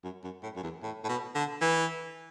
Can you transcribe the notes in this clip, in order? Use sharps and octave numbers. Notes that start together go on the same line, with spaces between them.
F#2
F#2
A2
F#2
E2
A2
A2
B2
D3
E3